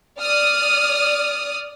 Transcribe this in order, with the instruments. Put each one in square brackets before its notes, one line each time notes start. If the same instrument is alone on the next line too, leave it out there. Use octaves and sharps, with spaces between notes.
[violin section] D5 D#6 F6